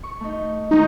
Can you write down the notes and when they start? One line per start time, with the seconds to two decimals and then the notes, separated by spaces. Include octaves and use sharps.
0.03 C#6
0.20 A3 D#4
0.71 D#3 G#3 A3 D#4